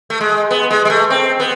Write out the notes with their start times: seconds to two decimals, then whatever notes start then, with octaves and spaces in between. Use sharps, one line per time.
0.10 A3
0.21 G#3
0.51 B3
0.70 G#3
0.85 G#3
0.90 A3
1.10 C4
1.40 B3